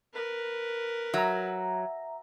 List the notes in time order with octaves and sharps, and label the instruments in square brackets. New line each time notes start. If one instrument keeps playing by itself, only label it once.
[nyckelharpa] A#4 B4
[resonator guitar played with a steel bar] F#3 [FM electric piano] E5 A#5